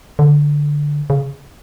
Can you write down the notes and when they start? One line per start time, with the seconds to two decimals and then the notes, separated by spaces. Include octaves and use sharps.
0.19 D3
1.10 C#3